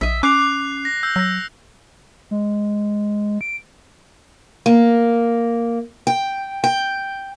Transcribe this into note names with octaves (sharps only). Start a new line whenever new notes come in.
A#1 D#5 E5
C#4 D6 F#6 C7 F7
A#6
E6 G6 A#6
F#3 E6 A#6
G#3
D7
A#3
G5
G5